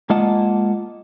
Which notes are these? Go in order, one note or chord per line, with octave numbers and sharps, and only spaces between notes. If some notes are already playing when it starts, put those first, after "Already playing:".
G#3 A#3 F4 D#5 F#5 A5